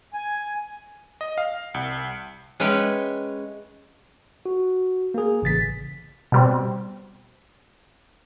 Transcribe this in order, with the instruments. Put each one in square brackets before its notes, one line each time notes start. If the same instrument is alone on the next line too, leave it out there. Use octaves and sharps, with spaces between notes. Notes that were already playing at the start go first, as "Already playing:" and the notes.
[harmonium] G#5
[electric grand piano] D#5
F5
C2
[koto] G#3 C#4 B4 C#5 E5 G5
[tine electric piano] F#4
A#3 G#4
A1 C#3 A6 B6
[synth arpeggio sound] B2 G3 C4